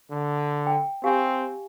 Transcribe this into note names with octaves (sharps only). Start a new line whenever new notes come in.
D3
G5
C4 G4 F5 G#5